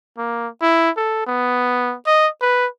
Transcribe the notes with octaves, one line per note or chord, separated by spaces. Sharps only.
A#3
E4
A4
B3
D#5
B4